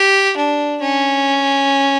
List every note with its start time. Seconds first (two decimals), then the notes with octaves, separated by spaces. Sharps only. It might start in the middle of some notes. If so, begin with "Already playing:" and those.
Already playing: G4
0.37 D4
0.81 C#4